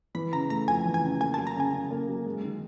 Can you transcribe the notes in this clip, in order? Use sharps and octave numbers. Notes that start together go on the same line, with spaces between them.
E3 B5
C#3 A#5
A3 A#5
F2 G#5
E3
G#5
C#3
A#3 G#5
A5
F#3
A#5
C#3 G#5
C#3
A#3
F#3
G#3
D#3